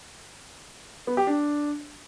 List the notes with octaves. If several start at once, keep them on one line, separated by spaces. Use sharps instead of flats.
B3
G4
D4